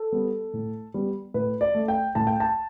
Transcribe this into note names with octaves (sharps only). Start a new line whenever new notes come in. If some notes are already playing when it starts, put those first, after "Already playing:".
Already playing: A4
G3 B3
A2
G3 B3
A2 B4
D5
A3
G5
A2 A5
G5
A5